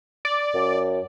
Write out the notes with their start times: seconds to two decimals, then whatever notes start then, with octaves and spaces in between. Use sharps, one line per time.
0.25 D5
0.54 F#2